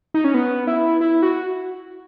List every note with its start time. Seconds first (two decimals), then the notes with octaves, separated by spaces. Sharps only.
0.14 D#4
0.24 C#4
0.34 B3
0.67 E4
1.01 E4
1.22 F#4